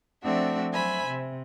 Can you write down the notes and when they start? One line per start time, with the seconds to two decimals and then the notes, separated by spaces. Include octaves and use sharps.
0.24 F3 A3 C4 D4 F#4 E5
0.73 F#3 C5 E5 G#5 B5
1.05 C3